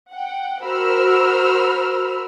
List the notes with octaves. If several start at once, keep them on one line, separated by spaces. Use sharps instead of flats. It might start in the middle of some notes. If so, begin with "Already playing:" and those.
F#5 G5
F#4 A#4 C5 B5 E6 F6